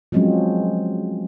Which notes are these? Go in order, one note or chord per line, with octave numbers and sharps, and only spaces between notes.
F3 F#3 G#3 C4 C#4